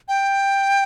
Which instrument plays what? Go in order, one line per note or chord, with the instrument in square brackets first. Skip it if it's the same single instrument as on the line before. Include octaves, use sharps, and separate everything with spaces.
[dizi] G5